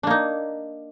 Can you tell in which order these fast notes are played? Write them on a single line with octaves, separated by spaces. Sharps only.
D4 A#3 D#4